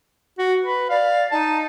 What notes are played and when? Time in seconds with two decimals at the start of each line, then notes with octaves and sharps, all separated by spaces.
0.38 F#4
0.62 B4
0.89 D5 F5
1.31 D#4 A5